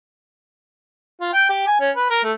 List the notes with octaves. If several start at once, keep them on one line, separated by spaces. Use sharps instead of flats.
F4
G5
G4
G#5
C#4
B4
A#4
A3